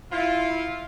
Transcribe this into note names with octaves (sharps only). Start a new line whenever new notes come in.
E4 F4